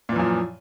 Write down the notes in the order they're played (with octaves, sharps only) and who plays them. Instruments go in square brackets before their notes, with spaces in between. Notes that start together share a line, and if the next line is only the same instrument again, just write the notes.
[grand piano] A#2
E3
F#2
F3